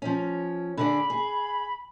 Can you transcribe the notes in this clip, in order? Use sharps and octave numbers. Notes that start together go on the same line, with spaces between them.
F3 C#4
D3 G#4 D5 B5
G#4